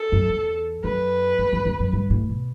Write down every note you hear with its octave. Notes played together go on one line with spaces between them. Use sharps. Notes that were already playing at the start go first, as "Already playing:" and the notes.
Already playing: A4
F#2
E2
F#2 B4
F#2
E2
E2
F#2
G2
A2
B2